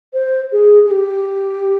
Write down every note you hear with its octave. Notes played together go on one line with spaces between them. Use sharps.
C5
G#4
G#4
G4